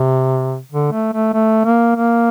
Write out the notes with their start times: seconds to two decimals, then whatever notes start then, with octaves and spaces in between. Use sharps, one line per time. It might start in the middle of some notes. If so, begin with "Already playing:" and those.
Already playing: C3
0.72 D3
0.92 A3
1.13 A3
1.34 A3
1.65 A#3
1.96 A#3